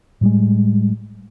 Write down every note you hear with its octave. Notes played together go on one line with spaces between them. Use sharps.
A2 G3 G#3